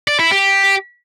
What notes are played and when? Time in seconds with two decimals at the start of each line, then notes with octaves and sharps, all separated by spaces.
0.08 D5
0.19 E4
0.31 G4